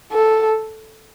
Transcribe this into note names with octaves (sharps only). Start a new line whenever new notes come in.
A4